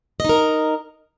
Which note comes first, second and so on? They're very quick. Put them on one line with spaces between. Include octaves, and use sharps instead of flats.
D#5 D#4 A#4